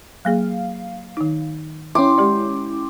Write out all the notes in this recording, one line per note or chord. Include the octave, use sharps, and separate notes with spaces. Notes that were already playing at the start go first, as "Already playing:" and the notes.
F#3 A#3 G#4 F5
D#3 D#4
C#4 E4 G5 C6 D6
G#3 G4 D5